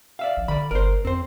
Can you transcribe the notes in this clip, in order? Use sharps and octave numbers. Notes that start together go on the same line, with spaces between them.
D5 E5 F5
A#1
D3 D5 B5
G1 A#4 C5
F2 C4 C5